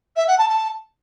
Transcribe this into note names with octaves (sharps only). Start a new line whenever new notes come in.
E5
F#5
A5
A5